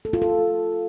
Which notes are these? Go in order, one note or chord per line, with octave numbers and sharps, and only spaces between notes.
A4
F4
A4